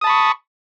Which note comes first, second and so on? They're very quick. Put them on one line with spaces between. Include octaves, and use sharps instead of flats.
D#6 A5 B5 C#6